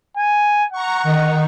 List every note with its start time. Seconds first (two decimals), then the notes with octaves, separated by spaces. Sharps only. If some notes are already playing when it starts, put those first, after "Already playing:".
0.17 G#5
0.72 F#5 A#5 C#6
1.03 D#3 D#4